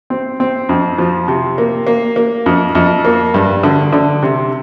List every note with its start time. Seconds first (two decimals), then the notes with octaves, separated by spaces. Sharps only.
0.10 C4
0.40 C4
0.69 F2
0.98 F3
1.28 C3
1.58 A#3
1.87 A#3
2.16 A#3
2.46 F2
2.75 F2
3.05 A#3
3.34 G2
3.63 D3
3.93 D3
4.23 C3